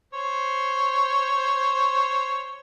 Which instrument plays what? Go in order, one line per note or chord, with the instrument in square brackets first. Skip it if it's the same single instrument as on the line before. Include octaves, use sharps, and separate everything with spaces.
[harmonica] C5 C#5